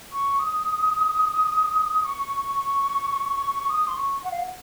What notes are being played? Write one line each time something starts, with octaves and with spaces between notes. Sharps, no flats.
C#6
D#6
C#6
D#6
C6
C#6
F#5
F5
F#5